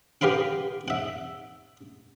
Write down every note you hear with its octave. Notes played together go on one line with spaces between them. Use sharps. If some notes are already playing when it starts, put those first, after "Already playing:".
G4 A#4 B4 F5 F#5
E5 F#5